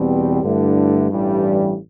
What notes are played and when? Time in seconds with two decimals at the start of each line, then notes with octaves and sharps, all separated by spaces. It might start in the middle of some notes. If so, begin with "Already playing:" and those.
Already playing: E2 B2 G3 C4
0.42 G2 D3 A3 E4
1.10 A1 G2 E3 G3